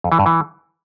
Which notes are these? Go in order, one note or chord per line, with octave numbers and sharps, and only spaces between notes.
F2
E3
G2
E3